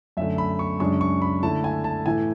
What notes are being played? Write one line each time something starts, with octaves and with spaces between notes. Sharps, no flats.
F#2 D3 A3 E5
B5
C#6
F#2 C#3 G#3 D4 C#6
C#6
B5
D3 A3 E4 A5
G#5
A5
A2 E3 A3 G#5